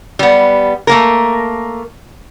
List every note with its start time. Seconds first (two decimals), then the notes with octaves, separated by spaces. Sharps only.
0.19 G3 B3
0.87 A3 A#3 A#4